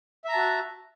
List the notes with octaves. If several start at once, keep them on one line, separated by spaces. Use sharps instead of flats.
F#4 E5 A5 A#5